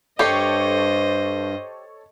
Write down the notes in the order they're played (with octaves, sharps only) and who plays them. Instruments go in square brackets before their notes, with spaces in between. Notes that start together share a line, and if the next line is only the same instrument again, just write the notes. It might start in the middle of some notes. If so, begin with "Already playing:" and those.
[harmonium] G2 [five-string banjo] G4 [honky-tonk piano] A4 C#5 C7 [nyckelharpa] C5 D#5